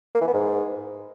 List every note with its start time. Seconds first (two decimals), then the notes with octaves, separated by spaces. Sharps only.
0.15 A#3
0.21 E3
0.27 B3
0.34 G#2